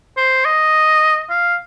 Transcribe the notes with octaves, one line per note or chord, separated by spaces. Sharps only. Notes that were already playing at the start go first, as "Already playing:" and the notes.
C5
D#5
F5